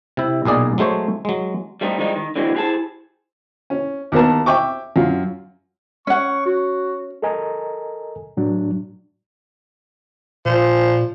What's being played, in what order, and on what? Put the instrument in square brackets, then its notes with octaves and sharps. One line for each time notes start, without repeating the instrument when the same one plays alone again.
[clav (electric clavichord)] C3 E4
B1 A#2 G#4 D5 D#5
F#3 G#3 A3 C5 C#5
F#3 G#3
[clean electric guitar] G3 A3 C4 C#4 D#4
D#3 F3 G3 G#3 D#4
D#3
D3 E3 F#3 G#3 C4 E4
E4 G4 G#4 C5 A5
[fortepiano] C#4
D#2 B3 A#4 A5
E5 G5 C#6 D6
F#2 F4
[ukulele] C#4 F#5 [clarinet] C#6
[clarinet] F#4
[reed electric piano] A4 A#4 D#5 G#5 A#5
A2 F#3 D4
[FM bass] A#2 [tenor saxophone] F3